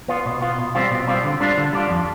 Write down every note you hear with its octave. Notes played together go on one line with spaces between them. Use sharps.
B3 F4
B2
B3 F4
B2
G3 C4 F4
B2
G3 C4 F4
D3
G3 D4 F4
D3
G3 D4 F4
F2